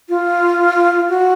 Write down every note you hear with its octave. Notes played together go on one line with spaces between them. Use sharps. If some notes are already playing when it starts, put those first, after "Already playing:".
F4
F#4